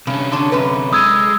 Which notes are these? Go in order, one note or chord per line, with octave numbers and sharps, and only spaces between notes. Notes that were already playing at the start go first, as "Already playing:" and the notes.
G2 C3 C#4
D3 D4 C#5
F#2 D3 B4
G#3 D#6 E6 G#6